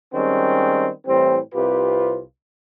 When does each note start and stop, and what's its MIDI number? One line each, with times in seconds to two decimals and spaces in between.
0.13 0.89 51
0.13 0.89 55
0.13 0.89 56
0.13 0.89 60
0.13 0.89 61
1.07 1.38 45
1.07 1.38 52
1.07 1.38 55
1.07 1.38 60
1.55 2.21 36
1.55 2.21 48
1.55 2.21 65
1.55 2.21 67
1.55 2.21 71